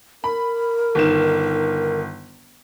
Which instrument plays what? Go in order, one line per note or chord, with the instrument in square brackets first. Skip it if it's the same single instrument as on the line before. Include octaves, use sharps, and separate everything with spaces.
[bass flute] A#4 [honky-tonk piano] B5
[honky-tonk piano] G1 D#3 E7